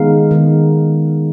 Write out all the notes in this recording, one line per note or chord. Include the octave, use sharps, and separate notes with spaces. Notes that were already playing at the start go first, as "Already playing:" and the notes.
Already playing: D#3 G#3 B3 D#4 F5
D#3 G#3 B3 D#4